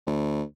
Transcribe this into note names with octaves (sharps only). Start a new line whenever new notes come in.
D2